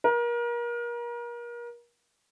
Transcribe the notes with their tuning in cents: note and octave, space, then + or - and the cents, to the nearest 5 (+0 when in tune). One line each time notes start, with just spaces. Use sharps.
A#4 +35